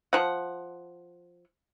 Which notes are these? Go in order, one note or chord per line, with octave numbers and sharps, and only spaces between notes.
F3 F#5